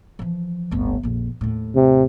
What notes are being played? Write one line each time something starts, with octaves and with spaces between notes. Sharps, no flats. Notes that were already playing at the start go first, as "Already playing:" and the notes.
E3 F3
D1 G1
A#1 F2
D#2 A2
C3